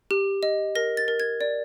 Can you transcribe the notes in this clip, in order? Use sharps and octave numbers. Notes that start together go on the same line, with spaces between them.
G4
D#5
A#4 A#6
A6
A#4
G#6
D5